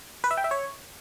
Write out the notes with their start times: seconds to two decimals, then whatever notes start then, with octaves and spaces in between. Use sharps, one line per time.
0.24 B4
0.31 E5
0.37 G5
0.44 E5
0.51 C#5